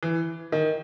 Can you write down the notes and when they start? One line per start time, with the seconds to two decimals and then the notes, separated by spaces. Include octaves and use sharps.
0.03 E3
0.52 D#3